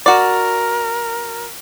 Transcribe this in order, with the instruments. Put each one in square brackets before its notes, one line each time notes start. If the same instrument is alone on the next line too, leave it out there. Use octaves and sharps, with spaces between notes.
[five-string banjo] F#4 D5 [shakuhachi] A#4